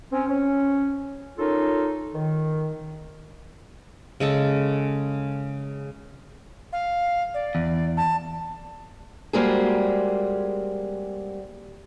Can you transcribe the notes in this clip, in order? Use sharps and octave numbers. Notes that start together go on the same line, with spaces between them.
C4 C#4
C#4
C#4 D#4 F4 A4 A#4
D#3
C#3 G#3 A4
F5
D5
E2
A5
G3 G#3 A#3 C4 F#4 G#4